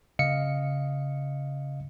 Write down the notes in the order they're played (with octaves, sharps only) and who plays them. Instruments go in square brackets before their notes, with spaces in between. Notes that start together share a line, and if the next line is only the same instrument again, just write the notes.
[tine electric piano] C#3 D#5 F5 C#7